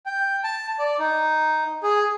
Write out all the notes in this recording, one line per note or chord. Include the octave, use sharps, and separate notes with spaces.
G5
A5
D5
D#4
G#4